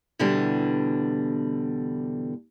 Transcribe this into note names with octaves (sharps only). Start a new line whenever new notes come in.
E2 B2 D3 E3 G3 D4